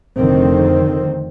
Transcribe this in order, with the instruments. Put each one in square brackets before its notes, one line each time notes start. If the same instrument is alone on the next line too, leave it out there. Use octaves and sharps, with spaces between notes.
[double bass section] F1 F2 D3 D#3 C4